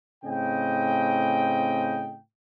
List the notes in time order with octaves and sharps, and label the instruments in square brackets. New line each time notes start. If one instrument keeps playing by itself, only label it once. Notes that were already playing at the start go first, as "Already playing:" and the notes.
[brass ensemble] A2 C#3 C4 D#5 G5